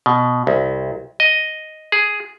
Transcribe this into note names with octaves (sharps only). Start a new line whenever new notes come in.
B2
C2
D#5
G#4